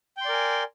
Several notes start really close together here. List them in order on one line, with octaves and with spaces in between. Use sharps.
G5 C6 D5 A#4 G#5